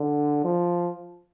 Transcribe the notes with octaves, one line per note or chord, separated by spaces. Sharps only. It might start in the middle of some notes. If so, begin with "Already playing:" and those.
Already playing: D3
F3